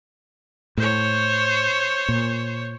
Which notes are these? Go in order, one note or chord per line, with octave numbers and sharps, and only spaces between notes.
A2 C5 C#5
A#2